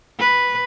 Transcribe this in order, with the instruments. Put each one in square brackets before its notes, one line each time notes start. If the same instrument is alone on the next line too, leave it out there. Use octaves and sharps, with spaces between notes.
[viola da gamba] B4